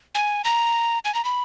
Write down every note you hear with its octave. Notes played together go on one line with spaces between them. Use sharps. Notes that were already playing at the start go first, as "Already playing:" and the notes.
G#5
A#5
G#5
A#5
B5